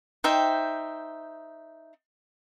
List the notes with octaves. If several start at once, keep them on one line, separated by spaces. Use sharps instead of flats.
D#4 C5 E5 G5